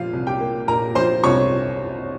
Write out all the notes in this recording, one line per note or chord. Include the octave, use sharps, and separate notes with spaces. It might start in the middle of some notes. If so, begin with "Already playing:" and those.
Already playing: A#2 F3 F4 F5
C2
G4 G5
A#3
A#2 A#4 A#5
F3 C5 C6
C2 C#5 C#6